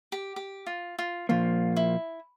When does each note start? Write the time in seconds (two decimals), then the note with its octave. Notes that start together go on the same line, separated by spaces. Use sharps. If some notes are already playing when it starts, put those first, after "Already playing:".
0.12 G4
0.36 G4
0.67 F4
0.99 F4
1.29 A#2 F3 A#3 F4
1.76 E4